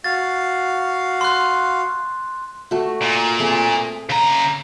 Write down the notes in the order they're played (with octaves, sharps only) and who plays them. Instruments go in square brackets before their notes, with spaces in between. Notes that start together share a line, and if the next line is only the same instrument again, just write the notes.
[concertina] F#4 F5 [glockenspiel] A6
[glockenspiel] C6 F#6
[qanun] A3 F#4
[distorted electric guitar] A#2
[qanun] A3 C4 G#4
[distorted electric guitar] C#3 A#5